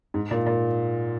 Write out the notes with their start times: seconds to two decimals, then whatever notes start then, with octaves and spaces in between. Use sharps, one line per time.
0.14 G#2
0.31 A#2
0.46 A#2